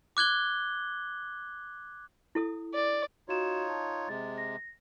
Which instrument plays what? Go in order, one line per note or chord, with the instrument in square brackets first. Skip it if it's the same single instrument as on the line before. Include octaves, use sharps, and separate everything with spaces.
[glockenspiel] D6 F#6 G#6 G7
[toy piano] E4 A4 D#6
[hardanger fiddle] D5
[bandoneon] D#4 F4 C#5 [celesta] F#4 E7
[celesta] A5
[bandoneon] C3 G#3 [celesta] A6
[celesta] A#6